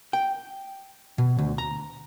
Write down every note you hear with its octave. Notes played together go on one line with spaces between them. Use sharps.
G5
B2
D2
A#5